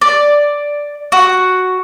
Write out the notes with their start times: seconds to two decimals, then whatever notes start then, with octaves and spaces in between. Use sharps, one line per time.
0.01 D5
1.12 F#4